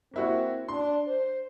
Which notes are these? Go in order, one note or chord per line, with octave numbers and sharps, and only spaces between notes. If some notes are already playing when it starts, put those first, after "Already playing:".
A#3 C4 E4 F#4
D4 C6
C5